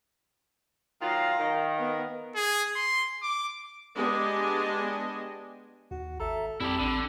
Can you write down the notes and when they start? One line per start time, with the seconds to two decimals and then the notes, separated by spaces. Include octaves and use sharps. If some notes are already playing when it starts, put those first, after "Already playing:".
1.02 D#3 F#3 F4 F5 A#5
1.39 D#3
1.77 B3 A#4
2.35 G#4
2.76 C6
3.22 D6
3.96 G#3 B3 D4 G4 D#5 G#5
5.91 D#2 F#4
6.20 G#1 A4 E5 A#5
6.60 F2 G3 C4 E4 G4 A5 B5
6.80 A1 D3 D4